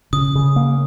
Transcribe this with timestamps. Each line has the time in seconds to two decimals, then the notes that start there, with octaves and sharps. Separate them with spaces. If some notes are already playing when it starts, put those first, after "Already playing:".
0.13 C#3 D#6
0.35 C#3
0.56 A#3